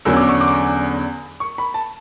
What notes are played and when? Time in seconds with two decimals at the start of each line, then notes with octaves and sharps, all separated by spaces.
0.05 E2 D3 F#3 C#4 E6
0.17 D6
0.29 C#6
0.41 D6
1.40 C#6
1.58 B5
1.74 A5